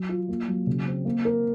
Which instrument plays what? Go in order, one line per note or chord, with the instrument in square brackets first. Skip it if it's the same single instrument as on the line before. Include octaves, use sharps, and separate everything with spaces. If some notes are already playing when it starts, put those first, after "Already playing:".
Already playing: [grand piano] F#3
F4
A#3
F#3
C#3
C4
A#3
A#4